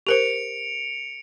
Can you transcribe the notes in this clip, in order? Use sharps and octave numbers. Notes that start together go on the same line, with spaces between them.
G4 A#4 C5 C#7 D7 F7